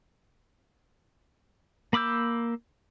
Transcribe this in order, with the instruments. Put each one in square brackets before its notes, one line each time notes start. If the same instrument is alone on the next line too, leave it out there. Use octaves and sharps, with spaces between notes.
[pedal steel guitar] A#3 B5 D6 E6 G6